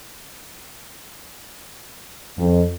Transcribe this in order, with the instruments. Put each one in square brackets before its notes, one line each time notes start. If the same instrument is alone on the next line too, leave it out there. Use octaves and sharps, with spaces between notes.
[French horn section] F2